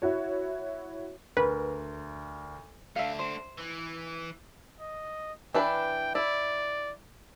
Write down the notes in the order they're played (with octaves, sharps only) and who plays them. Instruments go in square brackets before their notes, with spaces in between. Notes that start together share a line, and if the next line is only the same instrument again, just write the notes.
[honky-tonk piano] E4 F#4 C#5
[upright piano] D2 A#4 [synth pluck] B4
[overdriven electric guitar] A3 D4 [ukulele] E5 F5
[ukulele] C5
[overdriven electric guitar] E3
[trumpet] D#5
[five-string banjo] E3 D4 B4 [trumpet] G5
[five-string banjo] E4 [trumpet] D5